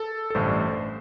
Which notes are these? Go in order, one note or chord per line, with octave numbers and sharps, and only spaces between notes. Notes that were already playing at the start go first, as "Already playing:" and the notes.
Already playing: A4
A4
A1 G2 D3 A3 C5